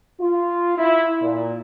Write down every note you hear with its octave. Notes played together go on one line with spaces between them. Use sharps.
F4
E4
A#2